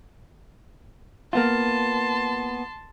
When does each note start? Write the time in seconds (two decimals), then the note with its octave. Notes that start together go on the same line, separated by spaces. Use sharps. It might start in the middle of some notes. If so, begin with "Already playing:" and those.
1.33 A#3 B3 F4 A5 C6